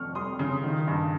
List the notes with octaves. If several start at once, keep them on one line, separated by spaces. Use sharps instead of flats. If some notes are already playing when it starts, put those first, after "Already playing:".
Already playing: F1 F2 C#6 F6
G3 C6 D#6
C#3
D#3
G2